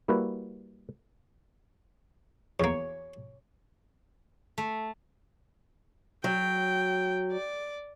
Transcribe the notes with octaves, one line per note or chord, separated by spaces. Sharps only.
G3 A#3 E4 F#4 B4 E5
E2 A#3 C#5
A3
F#3 G5
D5